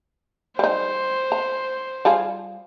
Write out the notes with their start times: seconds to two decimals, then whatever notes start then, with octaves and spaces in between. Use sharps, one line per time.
0.59 G3 D#4 C5
1.32 A#5
2.05 G3 F4 G#4